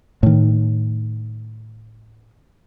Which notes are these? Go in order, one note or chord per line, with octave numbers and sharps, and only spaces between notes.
A2 D#3